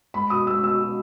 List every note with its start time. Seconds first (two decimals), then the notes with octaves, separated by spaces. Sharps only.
0.14 G#3 B5
0.30 B2 D#6
0.47 G#3 E6
0.63 B2 E6
0.79 B2